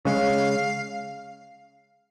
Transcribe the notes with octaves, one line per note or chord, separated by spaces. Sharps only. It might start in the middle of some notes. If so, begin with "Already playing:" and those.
C#3 G#3 C#4 F5